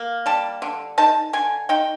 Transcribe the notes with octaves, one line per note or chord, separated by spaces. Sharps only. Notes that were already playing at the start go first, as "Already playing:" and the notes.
Already playing: A#3
G3 A5
D3
D#4 A5
D3 G#5
D#4 G5